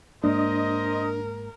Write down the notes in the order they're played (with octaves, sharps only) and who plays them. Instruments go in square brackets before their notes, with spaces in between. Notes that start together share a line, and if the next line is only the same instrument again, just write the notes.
[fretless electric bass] G#2 G#3 A#3 [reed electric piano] D4 [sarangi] A#4 [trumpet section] C5 D#5